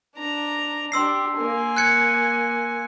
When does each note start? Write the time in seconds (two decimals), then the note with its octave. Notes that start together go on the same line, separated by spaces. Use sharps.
0.16 D4 A#5
0.92 D4 G4 C6 E6 C7
1.37 A#3 G#5
1.77 F#6 G#6 C#7